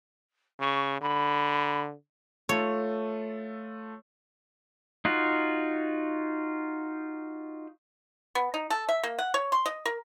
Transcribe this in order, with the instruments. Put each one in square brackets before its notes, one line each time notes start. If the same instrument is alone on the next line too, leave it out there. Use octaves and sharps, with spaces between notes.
[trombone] C#3 [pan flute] C#6
[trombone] D3 [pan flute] B5
[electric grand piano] A3 F4 A4 [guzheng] C#5
[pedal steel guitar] D#4 F4 F#4
[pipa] B3
D#4
A4
E5
A#3
F#5
C#5
C6
D#5
A#4